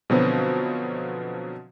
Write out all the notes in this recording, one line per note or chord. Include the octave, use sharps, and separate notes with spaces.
B2 D3 F3 F#3 B3 C4